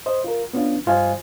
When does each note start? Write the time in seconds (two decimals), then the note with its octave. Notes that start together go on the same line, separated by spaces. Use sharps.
0.06 C5 D#5
0.24 F4 A#4
0.53 B3 C#4 D4 F4
0.86 G2 G3 F4 C5 D#5 G#5